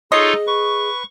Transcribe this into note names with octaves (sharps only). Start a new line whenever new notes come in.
D#4 F4 G#4 A4 C#5 D#5 C6 C#6
B4 C#6